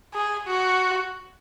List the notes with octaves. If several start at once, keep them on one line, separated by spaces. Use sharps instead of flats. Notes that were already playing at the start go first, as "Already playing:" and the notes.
G#4
F#4